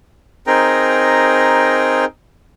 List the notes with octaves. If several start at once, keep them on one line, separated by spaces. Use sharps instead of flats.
C4 D#4 G#4 A#4 G5 A#5